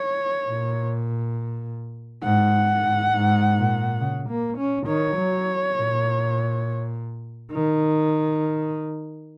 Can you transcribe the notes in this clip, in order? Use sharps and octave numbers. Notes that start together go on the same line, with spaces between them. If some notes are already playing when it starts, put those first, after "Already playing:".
Already playing: C#5
A#2
G#2 F#5
G#2
G#2
A#2
C#3
A#3
C#4
D#3 C#5
F#3
A#2
D#3